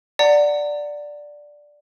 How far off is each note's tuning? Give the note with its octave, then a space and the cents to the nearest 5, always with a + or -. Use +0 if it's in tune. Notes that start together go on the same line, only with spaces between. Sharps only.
D5 +0 F#5 +0 A#5 -40